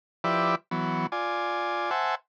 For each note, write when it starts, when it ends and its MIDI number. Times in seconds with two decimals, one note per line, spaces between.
0.24 0.55 53
0.24 0.55 64
0.24 0.55 67
0.24 0.55 71
0.24 0.55 74
0.24 0.55 76
0.71 1.07 52
0.71 1.07 54
0.71 1.07 59
1.12 1.90 65
1.12 1.90 74
1.12 1.90 80
1.91 2.15 72
1.91 2.15 76
1.91 2.15 78
1.91 2.15 80
1.91 2.15 81